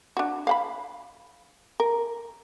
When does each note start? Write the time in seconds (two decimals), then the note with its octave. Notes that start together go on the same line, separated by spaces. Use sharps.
0.17 D4 F#4
0.47 F5 F#5 B5
1.80 A#4